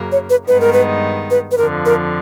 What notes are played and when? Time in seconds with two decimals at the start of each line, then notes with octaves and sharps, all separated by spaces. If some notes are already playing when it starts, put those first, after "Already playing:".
Already playing: F#2 C#3 F#3 A#3
0.12 C#5
0.30 B4
0.48 G2 D#3 G#3 B3 D#4 B4
0.60 A#4
0.73 B4
1.31 B4
1.51 B4
1.58 F2 D3 F3 A#4
1.85 A#4